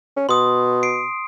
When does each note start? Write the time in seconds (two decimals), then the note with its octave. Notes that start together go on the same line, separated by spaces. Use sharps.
0.17 C#4
0.29 B2 C6 D#6
0.83 C7 D7